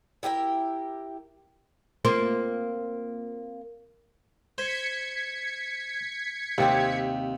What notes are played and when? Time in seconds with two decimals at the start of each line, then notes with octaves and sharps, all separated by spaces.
0.23 E4 G4 A#4 G5
2.05 A#3 C4 F4
4.58 C5 G#6 B6 C#7
6.58 D#2 C3 C4 G4